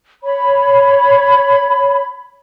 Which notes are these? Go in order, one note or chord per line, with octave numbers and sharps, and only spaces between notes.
C#5 B5